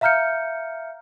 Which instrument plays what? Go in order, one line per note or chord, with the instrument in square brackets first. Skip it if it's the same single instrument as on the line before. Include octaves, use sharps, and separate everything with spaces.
[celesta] E5 F5 A#5 F6 G6 C#7